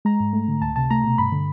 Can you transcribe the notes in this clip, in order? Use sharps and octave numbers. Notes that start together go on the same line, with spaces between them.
G#3 A#5
G#2
A3
D3
C#2 A5
C3 A5
A3 A#5
B2
G2 B5
D3